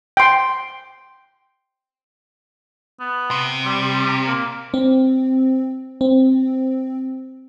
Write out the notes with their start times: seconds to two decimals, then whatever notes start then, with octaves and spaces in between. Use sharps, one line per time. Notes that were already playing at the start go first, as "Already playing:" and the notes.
0.17 G5 C6
3.00 B3
3.31 C3
3.66 G3
4.27 A#3
4.74 C4
6.01 C4